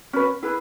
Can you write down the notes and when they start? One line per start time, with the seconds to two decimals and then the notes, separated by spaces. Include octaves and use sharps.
0.13 C#4 F#4 B4
0.43 E4 G#4 B4